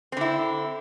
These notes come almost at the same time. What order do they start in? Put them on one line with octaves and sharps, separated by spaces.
C4 D3 E4